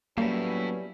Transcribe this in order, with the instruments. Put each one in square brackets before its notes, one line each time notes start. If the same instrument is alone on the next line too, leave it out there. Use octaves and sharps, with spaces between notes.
[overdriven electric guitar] A2 E4 [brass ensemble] F#3 B3 C#4 [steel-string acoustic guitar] G3 [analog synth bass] A#3